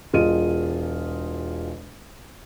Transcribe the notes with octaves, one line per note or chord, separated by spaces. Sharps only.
E1 F4 G#4 D#5 D#7